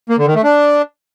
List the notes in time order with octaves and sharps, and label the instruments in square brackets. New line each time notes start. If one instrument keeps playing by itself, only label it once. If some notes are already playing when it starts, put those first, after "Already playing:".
[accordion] A#3
D3
D#3
A3
D4